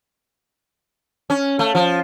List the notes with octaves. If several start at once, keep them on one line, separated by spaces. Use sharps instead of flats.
C#4
A3
F3